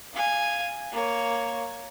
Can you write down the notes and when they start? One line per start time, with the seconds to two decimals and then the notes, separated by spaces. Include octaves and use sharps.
0.13 F5 G#5
0.92 A#3 C#5